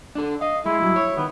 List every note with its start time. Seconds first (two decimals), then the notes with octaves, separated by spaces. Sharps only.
0.15 D4 A4
0.41 D#5 F5
0.66 G#3 E4
0.82 G2 F#3
0.96 C#5
1.17 D#3 B3